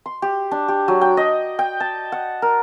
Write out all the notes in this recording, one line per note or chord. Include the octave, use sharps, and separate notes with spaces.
C6
G4
D4
G4
F#3
G5
D#5
G5
A5
F#5
A#4